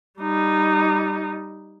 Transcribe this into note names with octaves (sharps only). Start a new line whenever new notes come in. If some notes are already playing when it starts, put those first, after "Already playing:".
G3 D#4